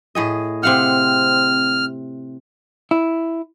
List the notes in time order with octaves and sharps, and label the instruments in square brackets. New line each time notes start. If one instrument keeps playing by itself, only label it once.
[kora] A2 G#4 D#5
[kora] C3 F5 F#5 [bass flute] C4 [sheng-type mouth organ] F6
[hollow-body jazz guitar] E4